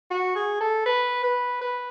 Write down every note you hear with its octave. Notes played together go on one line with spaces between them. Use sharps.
F#4
G#4
A4
B4
B4
B4